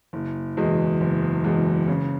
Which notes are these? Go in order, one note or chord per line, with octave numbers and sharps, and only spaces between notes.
F#1
E2 B2 G#3
F#1
E2 B2 G#3
C#3